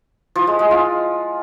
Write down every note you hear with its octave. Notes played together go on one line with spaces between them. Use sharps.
F3
G#3
G#3
F4